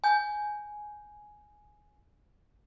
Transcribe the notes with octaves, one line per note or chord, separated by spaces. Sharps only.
G#5 G6